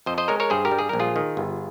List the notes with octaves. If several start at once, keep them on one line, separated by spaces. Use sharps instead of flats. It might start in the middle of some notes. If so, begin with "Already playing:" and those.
F2 C5 D#5
C5 D#5
G#3 A#4 C#5
A#4 C#5
G2 G#4 C5
G4 A#4
G3
G#4
A#1 A#4
F4 G#4
D#3
G1